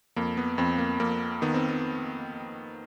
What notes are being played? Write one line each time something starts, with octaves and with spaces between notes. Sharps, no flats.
F2 A#3
B3
F2 C4
A#3
F2 A#3
D#3 B3
C4
B3